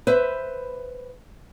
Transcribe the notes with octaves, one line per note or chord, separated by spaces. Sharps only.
B4 C5 E5